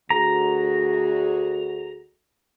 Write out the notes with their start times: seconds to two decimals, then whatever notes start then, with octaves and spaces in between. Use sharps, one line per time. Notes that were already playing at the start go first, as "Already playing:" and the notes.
0.10 D2 F#4 G#4 A#5